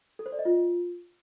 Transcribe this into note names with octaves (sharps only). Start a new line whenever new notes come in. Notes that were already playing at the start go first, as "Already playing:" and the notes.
A4
C5
D5
D#5
F4